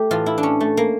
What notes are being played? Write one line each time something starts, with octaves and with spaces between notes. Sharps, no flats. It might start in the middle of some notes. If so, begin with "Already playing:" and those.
Already playing: A3 G4
A2 E3 F4
E4
D4
C#4
A3
A#3